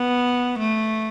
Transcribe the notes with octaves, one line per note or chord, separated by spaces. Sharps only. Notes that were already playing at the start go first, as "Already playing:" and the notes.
Already playing: B3
A3